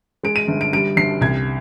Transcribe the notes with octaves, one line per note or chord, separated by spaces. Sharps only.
G#3 D7
D#7
G1
D7
G3 D7
G1 C7
C2 G#6